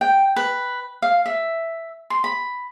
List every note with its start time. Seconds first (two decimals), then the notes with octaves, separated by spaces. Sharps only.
0.01 G5
0.36 B4
1.02 F5
1.26 E5
2.10 C6
2.24 B5